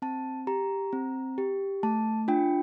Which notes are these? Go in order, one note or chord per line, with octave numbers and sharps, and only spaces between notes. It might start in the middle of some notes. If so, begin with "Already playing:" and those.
C4 A5
G4 A#5
C4
G4
A3 A5
D4 F4 G5